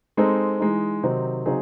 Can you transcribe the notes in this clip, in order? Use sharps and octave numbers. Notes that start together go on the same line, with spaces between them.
G#3 C4 D#4 A4
E3 G#3 D#4
C3 D#3 F#3 C4 D#4
C#3 F#3 C4 D#4 G#4